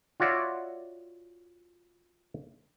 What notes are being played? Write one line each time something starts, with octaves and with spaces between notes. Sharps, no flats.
F4 F#4 C#5 D5 E5